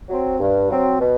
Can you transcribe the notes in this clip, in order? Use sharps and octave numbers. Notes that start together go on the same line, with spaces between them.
F#3 C4
G2
F#3 C4
B2